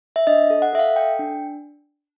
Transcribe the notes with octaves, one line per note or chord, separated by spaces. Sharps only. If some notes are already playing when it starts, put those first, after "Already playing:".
E5
D4 D#5
A4
F#5
A4 E5
F5
A4 G5
D4